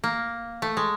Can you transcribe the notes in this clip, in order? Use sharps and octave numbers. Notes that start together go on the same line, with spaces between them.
A#3
A3
G#3